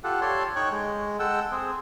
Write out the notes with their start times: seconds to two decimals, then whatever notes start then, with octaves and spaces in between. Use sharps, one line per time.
0.04 F4 G4 A4 F#5
0.22 G4 A4 C#5 D5 C6
0.56 D#4 C#5 G5 C#6 F#6
0.72 G#3
1.19 G#3 A4 F#5 G5 E6
1.51 C4 G#4